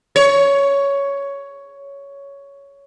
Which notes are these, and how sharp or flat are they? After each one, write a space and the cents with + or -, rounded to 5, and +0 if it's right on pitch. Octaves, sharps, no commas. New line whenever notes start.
C#5 +10